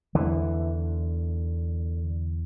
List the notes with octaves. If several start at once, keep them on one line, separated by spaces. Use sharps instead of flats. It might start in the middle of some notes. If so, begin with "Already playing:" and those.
E2 D3 E3